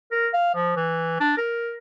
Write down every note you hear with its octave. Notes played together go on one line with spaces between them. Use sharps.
A#4
F5
F3
E3
D4
A#4